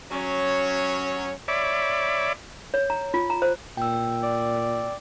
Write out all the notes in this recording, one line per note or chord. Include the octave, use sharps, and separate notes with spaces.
F#3 C#4 C#5
C#5 D5 E5 B5 D6
C#5
A#5
F4
A#5
C5
A#2 G5 E6
D5